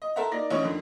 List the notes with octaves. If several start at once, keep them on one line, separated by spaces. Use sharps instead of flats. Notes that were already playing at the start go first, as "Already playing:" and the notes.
D#5
A4 A#4 C5 E5 F#5 A#5
A#3 D#4 D5 A#6
A1 C#4 D#5 C#6 D#6
F2 D3 D#3